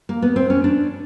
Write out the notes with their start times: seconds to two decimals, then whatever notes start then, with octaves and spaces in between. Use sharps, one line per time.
0.09 A#3
0.22 B3
0.36 C4
0.50 C#4
0.64 D4